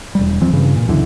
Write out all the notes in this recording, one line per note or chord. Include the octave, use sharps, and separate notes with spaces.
E1 G3
F2 E3 F3 C4
G2 C#3 E3
A#2
C#2 F#2 D3 E3